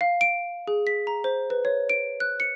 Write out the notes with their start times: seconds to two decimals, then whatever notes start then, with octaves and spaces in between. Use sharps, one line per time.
0.01 F5
0.21 D7
0.67 G#4
0.87 B6
1.07 A#5
1.24 C5
1.50 B4
1.65 C#5
1.90 D7
2.20 F#6
2.40 C#7